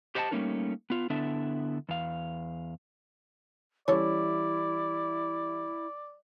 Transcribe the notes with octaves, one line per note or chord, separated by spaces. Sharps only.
G4 C5 D#5 F#5 G#5 A5
G3 A3 A#3 C#4 D#4 A#4
B3 F4
D3 B3 D4 E4 A4 E5
E2 F5
E3 G3 C#4 E4 A4 C#5 D5